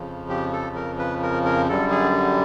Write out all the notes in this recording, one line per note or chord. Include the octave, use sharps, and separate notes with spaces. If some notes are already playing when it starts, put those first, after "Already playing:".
Already playing: F2 C#3 F3
G4
A4
A#4
B4
A#4
A#4
F#2 D3 G3 A4
G#4